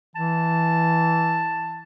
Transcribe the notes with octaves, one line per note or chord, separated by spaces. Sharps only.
E3 A5